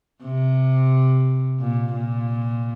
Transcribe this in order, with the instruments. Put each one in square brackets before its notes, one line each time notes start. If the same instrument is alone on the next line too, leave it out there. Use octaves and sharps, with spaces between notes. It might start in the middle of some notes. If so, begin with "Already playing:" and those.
[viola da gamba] C3
A#2
A#2